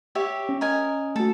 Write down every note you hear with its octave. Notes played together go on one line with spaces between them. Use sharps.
G4 C#5 E5
C#4
A#4 D#5 G#5
A3 F#4 A4